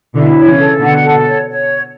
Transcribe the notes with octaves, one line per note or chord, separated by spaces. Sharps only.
B2 D3 E4
C#5
C#3 E3
A4
B2 D3 F#5
A4
B2
C#5
C#5